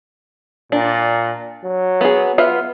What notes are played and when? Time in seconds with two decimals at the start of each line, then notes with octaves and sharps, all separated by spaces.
0.72 A#2 D4
1.65 F#3
2.01 B3 G#4
2.38 B3 F4 E5